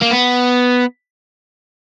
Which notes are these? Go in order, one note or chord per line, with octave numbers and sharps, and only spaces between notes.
A#3
B3